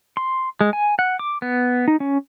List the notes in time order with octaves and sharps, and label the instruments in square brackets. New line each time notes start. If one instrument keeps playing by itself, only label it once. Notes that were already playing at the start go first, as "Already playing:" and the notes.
[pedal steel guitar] C6
G#3
G#5
F#5
D6
B3
D#4
C#4